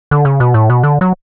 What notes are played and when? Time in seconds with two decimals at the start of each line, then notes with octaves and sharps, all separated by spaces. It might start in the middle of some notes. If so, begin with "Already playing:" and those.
0.11 D3
0.25 C#3
0.40 B2
0.54 A2
0.70 B2
0.83 D3
1.01 F#3